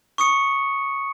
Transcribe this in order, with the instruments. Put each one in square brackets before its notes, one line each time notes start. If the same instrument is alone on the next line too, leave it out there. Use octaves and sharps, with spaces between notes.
[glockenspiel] C#6 D#6 C#7